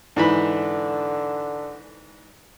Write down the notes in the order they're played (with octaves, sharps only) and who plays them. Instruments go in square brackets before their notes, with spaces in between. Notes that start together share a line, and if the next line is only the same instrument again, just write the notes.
[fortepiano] G#2 E3 B5 [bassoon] D3